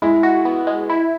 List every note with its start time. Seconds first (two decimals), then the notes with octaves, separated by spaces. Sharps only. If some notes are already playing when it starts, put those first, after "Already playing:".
0.02 G#3 E4
0.23 F#4
0.45 B3
0.67 G#3
0.90 E4